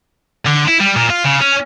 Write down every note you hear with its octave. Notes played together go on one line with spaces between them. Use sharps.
D3
E4
G3
A#2
F4
C#3
C#4